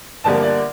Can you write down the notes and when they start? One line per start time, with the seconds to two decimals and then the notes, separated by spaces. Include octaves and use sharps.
0.24 G1 G2 D3 F3 A#3 A5
0.42 D5